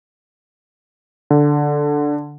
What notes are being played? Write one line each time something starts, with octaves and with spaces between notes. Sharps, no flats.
D3